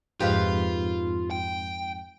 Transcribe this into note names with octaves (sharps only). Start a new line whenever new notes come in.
F2 G#2 F4 G4 B4 F5
G5